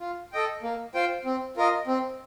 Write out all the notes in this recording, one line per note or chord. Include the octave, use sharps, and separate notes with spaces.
F4
A4 D#5 G5
A#3
F4 C5 G5
C4
F4 A#4 D#5
C4